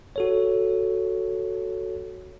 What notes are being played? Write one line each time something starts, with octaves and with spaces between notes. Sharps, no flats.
F#4 A4 C#5